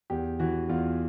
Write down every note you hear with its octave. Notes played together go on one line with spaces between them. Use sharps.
E2 G4
E3 F#4
E2 F4